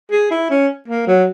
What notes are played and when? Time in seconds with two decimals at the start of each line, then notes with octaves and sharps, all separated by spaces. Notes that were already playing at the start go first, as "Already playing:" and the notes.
0.12 G#4
0.31 E4
0.51 C#4
0.88 A#3
1.07 F#3